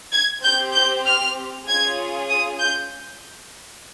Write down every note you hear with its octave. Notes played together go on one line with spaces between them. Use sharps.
G#6
C4 G4 G6
G6
F6
C#4 F4 G#4 G#6
D#6
G6